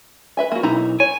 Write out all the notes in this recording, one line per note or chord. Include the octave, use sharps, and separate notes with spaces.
B4 E5 G#5
A#3 F#4
B1 D#4 E4 A#5
C#5 G#5